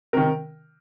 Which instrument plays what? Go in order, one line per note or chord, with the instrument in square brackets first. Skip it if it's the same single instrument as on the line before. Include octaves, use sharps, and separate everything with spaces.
[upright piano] C3 D#3 A#4